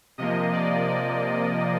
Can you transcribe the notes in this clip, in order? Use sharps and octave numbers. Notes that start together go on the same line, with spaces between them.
C3 F3 A#3 D#5
D5
D5